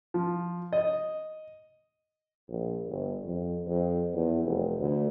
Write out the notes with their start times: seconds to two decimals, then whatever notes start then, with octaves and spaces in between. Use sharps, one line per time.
0.14 F3
0.73 D#5
2.49 A#1
2.88 G1
3.25 F2
3.67 F2
4.14 E2
4.45 F1
4.79 D2